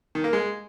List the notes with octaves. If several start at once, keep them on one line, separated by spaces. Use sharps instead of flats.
D#3
A#3
G#3